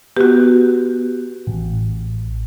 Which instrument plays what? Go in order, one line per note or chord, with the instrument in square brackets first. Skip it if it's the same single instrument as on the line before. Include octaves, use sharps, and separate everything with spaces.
[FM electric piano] B3 [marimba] F#4 G4
[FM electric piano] A1